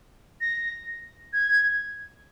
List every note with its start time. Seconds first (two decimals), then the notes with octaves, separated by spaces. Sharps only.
0.41 A#6
1.33 G#6